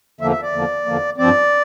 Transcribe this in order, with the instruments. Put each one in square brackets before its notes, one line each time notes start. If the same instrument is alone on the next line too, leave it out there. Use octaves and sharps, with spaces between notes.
[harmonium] E2 D3 F3 A#3 E5
E5
D5
E2 D3 F3 A#3
E2 D3 F3 A#3
G2 F3 C4 D5